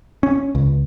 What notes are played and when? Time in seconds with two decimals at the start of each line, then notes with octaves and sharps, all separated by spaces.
0.23 C#4
0.55 C#2